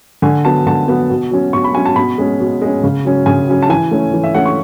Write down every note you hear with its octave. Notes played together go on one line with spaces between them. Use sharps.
D3 G#5
F#3 B3 A5
D3 A5
F#3 B3
B2
F#3 C#4
B2 C#6
B5
F#3 C#4 G#5
A5
B2 B5
G#3 C#4
B2
G#3 C#4
C#3
F#3 C#4
C#3 G#5
F#3 C#4
A5
E3 G#5
A3 C#4
E3
E5
A3 C#4 F#5
C#6